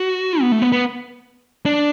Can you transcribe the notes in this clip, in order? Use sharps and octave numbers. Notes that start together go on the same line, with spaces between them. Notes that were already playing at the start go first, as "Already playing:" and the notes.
Already playing: F#4
B3
A3
B3
B3
D4